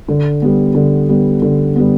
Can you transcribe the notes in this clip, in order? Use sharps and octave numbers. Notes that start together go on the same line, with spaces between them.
D3
G3 B3
D3
G3 B3
D3
G3 B3